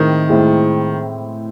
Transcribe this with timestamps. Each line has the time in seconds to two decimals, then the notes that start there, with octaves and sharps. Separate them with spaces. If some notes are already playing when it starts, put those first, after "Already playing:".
Already playing: A2 D#3 G#3 C4 E4
0.29 A2 G#3 C4 E4